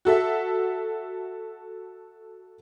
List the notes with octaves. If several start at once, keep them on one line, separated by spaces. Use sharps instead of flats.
F#4 A4 E5